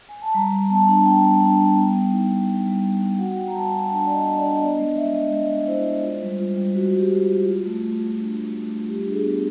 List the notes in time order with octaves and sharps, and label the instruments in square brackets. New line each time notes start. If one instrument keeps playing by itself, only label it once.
[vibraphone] G#5
A5
G3 A#5
G3
B3 A5
D4
B3 G5
G3
D4
G3
B3
B3
D#4
B3
G3
G3
D#4
B3
F#4 F#5
F#4 G5
A#5
G3 A5
F#4 G#5
D4 A5
B3 D5
D#5
D4
D5
D4
D#5
B3 D5
G#3
G#3 E5
G#3 D#5
G#3 D#5
G#3
E4 C5
G#3
F4
G3
F4
G3
G3 F#4
G3
G4
F4
G3
F4
A3
A3
F4
D4
A3
A3
F4
G3 G4
D4
G#4
B3